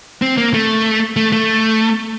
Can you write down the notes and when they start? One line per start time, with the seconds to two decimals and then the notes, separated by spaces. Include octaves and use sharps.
0.22 C4
0.38 A#3
0.54 A3
1.16 A3
1.32 A3